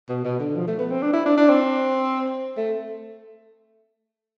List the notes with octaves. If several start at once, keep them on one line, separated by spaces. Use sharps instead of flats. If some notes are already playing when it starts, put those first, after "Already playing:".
B2
B2
D3
F3
A3
B3
C4
D4
E4
D4
D4
C4
A3